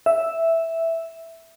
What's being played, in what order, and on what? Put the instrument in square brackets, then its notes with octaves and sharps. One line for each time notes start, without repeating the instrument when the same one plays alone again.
[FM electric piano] E5